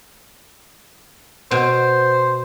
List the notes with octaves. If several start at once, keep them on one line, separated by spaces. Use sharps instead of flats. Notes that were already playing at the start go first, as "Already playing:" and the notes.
B2 C5